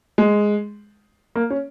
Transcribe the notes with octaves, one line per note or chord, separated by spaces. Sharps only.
G#3
A#3
C#4